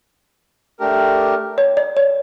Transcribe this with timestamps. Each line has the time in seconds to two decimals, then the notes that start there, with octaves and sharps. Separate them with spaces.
0.80 A3 D4 G4 A#4
1.58 C#5
1.77 D5
1.97 C#5